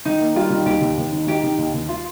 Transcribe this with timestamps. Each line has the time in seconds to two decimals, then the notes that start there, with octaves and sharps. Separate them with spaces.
0.05 D#3 D#4
0.21 A#3
0.35 G3 F4
0.50 D#3
0.66 D#2 G4
0.81 D#2
0.97 D#2
1.12 D#3
1.27 D#3 G4
1.44 D#3
1.58 D#2
1.74 D#2
1.89 F4